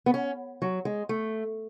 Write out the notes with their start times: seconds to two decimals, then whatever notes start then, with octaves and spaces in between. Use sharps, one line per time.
0.06 B3
0.14 C#4
0.62 F#3
0.85 G#3
1.09 A3